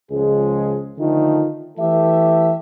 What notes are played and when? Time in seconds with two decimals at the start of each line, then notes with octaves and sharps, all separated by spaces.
0.11 C#2 F3 G#3 G#4
0.98 D3 D#3 F3 A3 D#4 F4
1.78 E3 A3 G4 A4 E5